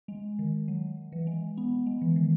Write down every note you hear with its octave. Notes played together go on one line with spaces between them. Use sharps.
G#3
D#3
F#3
E3
G#3
B3
G#3
E3
D#3